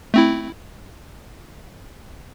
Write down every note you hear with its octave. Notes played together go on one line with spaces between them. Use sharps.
A3 C4 E4